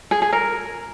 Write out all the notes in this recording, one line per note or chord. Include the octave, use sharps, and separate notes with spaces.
G#4
G#4
A#4